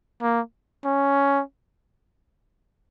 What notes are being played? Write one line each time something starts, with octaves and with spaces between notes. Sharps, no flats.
A#3
C#4